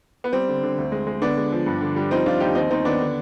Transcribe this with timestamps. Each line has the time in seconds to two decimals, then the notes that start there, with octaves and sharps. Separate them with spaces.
0.24 B3
0.33 G3 C4
0.48 D3
0.63 D3
0.78 D2
0.92 G#3
1.07 G#3
1.22 D3 B3 D4
1.37 G#3
1.52 F3
1.66 G2
1.81 D3
1.96 G3
2.11 F3 C4 D#4
2.26 F3 D4 F4
2.40 D#2 D#4 G4
2.55 D#2 C4 D#4
2.71 D#2 C4 D#4
2.85 D#3 B3 D4
3.00 D3